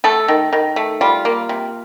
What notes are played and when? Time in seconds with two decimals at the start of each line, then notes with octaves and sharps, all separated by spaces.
0.04 A3 A4
0.28 D#3
0.53 D#3
0.76 A3
1.01 G3 F4
1.25 A#3
1.49 C3